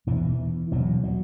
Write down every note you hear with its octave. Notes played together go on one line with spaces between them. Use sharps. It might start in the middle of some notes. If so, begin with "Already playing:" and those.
E2 B2 E3
E2 B2 F#3
F#3